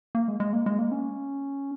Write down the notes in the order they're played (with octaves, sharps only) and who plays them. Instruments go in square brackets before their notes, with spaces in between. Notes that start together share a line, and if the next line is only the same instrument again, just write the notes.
[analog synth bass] A#3
G#3
G#3
A#3
G#3
A#3
C#4